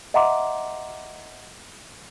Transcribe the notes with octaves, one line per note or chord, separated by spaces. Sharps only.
D#5 E5 F#5 A#5 C6 D6